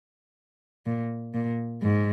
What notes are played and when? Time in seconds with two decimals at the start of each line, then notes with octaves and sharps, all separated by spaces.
0.86 A#2
1.34 A#2
1.83 G#2